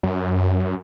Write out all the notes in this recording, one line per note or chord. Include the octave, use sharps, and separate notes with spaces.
F#2